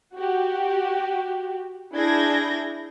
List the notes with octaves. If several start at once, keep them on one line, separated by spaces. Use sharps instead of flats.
F#4 G4
D4 E4 G#4 G6 G#6 A#6